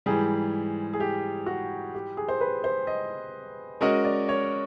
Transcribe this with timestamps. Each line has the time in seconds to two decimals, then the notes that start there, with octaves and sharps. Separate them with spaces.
0.06 G#2 E3 G3 G#4
0.93 G#4
1.00 G4
1.46 F#4
1.94 G4
2.17 G#4
2.28 C5
2.41 B4
2.64 C5
2.87 D#5
3.81 G#3 C#4 F#4 A#4 D#5
4.05 D5
4.29 C#5